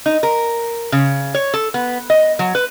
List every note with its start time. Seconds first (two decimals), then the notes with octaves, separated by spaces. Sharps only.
0.06 D#4
0.23 A#4
0.92 C#3
1.35 C#5
1.54 A4
1.74 B3
2.10 D#5
2.39 F#3
2.55 B4